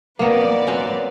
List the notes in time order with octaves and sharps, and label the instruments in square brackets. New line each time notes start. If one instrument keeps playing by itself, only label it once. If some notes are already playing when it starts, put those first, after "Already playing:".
[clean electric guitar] F2 G#2 A#4 [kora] A#3 B3 [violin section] B4 D5
[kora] C4 C#4 F#4